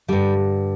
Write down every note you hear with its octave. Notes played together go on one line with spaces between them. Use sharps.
G2 D3 G3